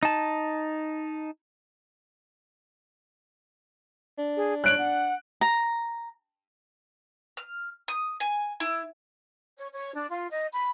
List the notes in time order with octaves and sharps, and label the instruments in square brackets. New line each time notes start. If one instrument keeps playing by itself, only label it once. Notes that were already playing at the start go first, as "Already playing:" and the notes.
[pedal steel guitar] D#4 A5
[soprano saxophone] D4
[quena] G#4
[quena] C#5 [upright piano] F#6 D7 F#7
[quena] F#5
[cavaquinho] A#5
[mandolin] F6
D#6
G#5
E4
[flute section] C#5
C#5
D4
F4
D#5
B5